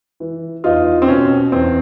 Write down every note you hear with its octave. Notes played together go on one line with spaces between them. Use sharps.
E3
E2 D#4 F4
C4
B2 C#4
E2 C4